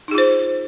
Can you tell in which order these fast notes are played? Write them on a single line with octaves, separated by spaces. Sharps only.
D#4 G#4 F4 C5